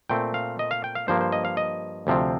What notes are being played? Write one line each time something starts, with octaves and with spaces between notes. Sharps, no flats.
A#2 A3 C4 G5
F5
D#5
F5
G5
F5
G2 F3 A#3 C5
C5
D#5
F5
D#5
D2 C3 F3 C4